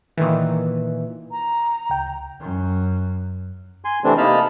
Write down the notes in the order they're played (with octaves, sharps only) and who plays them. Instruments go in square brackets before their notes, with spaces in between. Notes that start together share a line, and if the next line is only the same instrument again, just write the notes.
[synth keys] A#2 D#3 E3
[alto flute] A#5
[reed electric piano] C#2 G5
[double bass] F#2
[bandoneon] G#5 C6
C3 E3 A3 C4 D4
C3 A#3 D#4 A5 B5 F6